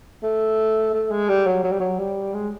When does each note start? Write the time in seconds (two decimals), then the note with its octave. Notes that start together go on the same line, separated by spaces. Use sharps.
0.23 A3
0.94 A3
1.11 G#3
1.29 G3
1.46 F#3
1.63 F#3
1.72 G3
1.80 F#3
1.99 G3
2.34 G#3